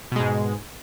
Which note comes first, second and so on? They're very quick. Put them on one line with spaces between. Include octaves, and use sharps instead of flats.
B2 G#3 G#2